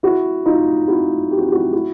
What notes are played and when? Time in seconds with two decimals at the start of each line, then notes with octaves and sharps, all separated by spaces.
0.03 E4 F#4
0.46 D#4 F4
0.88 E4 F#4
1.31 G4
1.38 F#4
1.46 F4
1.52 E4 F#4
1.73 E4 F#4